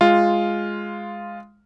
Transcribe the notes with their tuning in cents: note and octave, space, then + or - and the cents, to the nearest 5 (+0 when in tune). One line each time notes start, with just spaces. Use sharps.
G#3 +0 F4 +0